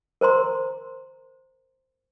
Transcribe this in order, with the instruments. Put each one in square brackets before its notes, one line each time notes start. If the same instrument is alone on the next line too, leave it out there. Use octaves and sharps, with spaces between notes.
[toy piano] A#4 C5 A#5 C6